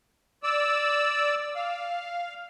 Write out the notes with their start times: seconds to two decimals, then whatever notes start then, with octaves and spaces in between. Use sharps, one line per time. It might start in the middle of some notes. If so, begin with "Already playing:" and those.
0.43 D5 E6
1.56 F5